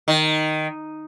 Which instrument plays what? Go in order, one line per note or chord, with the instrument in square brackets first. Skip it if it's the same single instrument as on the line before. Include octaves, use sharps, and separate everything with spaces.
[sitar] D#3